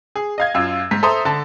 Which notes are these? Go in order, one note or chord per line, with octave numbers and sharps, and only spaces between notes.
G#4
D#5 F5 G#6
F#2 F4 E6
G#2 B6
A4 C5 E5 A#5 C6 D#6
D3 A5